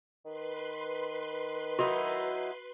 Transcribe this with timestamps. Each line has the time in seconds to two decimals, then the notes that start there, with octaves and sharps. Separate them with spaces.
0.25 D#3 B4 C6
1.79 F#3 D#4 E4 F#4